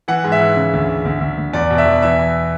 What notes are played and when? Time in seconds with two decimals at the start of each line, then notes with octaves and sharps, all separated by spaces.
0.08 E3 F#5
0.24 G#2
0.32 E5
0.40 E3
0.56 C#3
0.73 D2
0.88 D2
1.05 D2
1.21 D2
1.37 D2
1.53 E2 D5
1.70 B2
1.78 E5
1.85 E2
2.02 E3 E5
2.19 E3